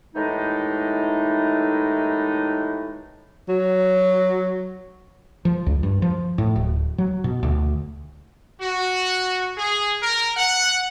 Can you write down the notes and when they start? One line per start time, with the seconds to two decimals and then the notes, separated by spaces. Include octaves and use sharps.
0.15 D#2 A2 E3 G#3 D#4
3.49 F#3
5.45 F3
5.66 C#2
5.83 G2
6.02 F3
6.38 A2
6.56 D1
6.98 F#3
7.24 B2
7.43 D2
8.61 F#4
9.57 G#4
10.02 A#4
10.37 F#5